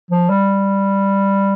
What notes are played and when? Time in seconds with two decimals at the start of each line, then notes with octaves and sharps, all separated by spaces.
0.11 F3
0.30 G3